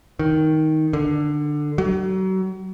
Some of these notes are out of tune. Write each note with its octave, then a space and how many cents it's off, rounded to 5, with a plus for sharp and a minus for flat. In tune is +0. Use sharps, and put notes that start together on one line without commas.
D#3 +10
D3 +15
F#3 +35